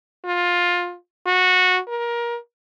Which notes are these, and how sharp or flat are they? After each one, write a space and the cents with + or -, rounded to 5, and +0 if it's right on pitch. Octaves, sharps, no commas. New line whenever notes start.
F4 +15
F#4 -15
A#4 +25